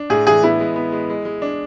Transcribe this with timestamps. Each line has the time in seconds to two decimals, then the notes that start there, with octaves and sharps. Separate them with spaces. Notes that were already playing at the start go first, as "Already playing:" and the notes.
Already playing: D4
0.10 A2 G#4
0.27 E3 G#4
0.43 B3 E4
0.60 G#3
0.76 B3
0.92 G#3
1.10 G#3
1.25 G#3
1.42 D4